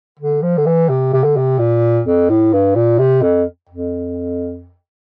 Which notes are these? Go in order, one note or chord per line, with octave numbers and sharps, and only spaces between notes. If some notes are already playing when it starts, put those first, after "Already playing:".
D3
F3
D3
E3
C3
C3
D3
C3
A#2
F2
A2
G2
A#2
C3
F2
F2